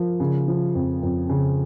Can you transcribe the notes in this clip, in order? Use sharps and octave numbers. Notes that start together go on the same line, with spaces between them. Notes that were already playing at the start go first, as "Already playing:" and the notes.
Already playing: F3 A#4
C#3
F3
F2
F2
C#3